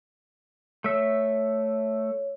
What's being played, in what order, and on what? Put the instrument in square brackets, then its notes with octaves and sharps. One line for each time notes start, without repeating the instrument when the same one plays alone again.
[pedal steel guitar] A3 E5 [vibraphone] C#5